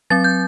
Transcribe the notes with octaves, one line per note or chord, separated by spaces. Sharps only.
F#3 C4 A6
G6